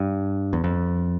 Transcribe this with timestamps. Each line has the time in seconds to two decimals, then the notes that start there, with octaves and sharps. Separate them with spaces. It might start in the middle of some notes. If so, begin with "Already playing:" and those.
Already playing: G2
0.53 E2
0.64 F2